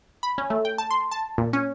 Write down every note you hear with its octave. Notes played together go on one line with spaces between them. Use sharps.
B5
C#4
A3
G5
A5
C6
A5
A#2
C#4